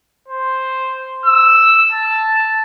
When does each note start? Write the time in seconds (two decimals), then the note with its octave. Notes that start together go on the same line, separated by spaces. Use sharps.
0.28 C5
1.26 E6
1.92 A5